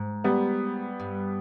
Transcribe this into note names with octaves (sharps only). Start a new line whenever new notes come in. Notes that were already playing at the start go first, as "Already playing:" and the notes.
Already playing: G#2
G3 B3
G2